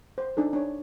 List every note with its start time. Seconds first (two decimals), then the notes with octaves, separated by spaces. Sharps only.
0.18 C5
0.37 D4 D#4 A4
0.53 D4 C#5